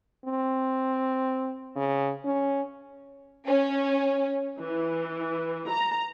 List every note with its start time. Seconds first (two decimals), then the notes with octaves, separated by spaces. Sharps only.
0.25 C4
1.76 C#3
2.25 C#4
3.47 C#4
4.61 E3
5.70 A#5